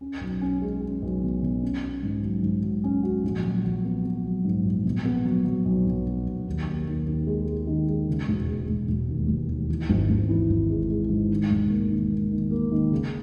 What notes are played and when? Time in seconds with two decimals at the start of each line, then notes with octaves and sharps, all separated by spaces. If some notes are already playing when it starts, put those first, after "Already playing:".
0.01 C#4
0.21 B1
0.41 C#4
0.62 G#3
0.81 C#4
1.02 B1
1.23 B2
1.43 B2
1.62 C#4
1.83 C#4
2.03 G#2
2.23 F#3
2.43 G#2
2.63 F#3
2.84 C#4
3.03 F#4
3.23 A#1
3.44 F#3
3.65 F#3
3.85 B3
4.05 B3
4.24 F#3
4.44 G#2
4.65 A#1
4.85 B2
5.05 B3
5.25 F#3
5.45 F#3
5.65 B1
5.86 B1
6.06 B1
6.26 B1
6.47 D#2
6.67 D#2
6.87 D#2
7.06 D#2
7.27 G#3
7.47 G#3
7.67 D#3
7.88 G#3
8.08 C#3
8.28 E1
8.48 G#3
8.68 E1
8.88 E1
9.08 D#2
9.28 E1
9.48 D#2
9.69 E3
9.89 G#1
10.10 G#1
10.29 E3
10.50 G#1
10.70 G#3
10.89 G#3
11.09 G#2
11.30 D#3
11.50 E1
11.70 A#3
11.90 D#3
12.11 A#3
12.31 D#3
12.51 A#3
12.72 D#3
12.92 C#3